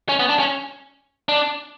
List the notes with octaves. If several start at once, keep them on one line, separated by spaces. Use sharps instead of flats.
C#4
B3
D4
C#4
D4